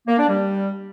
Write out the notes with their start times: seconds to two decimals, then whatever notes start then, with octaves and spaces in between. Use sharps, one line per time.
0.08 A#3
0.18 D4
0.29 G3